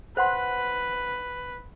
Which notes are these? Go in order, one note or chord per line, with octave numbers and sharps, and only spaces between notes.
B4 C5 F#5 C6